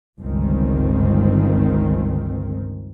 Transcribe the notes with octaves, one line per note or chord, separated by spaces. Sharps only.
G1 C#2 D#3 C4